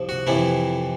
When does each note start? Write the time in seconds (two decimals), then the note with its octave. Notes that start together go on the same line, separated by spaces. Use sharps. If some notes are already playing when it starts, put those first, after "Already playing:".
Already playing: C2 F3
0.09 F#4
0.27 F2 C3 E3 A3 E4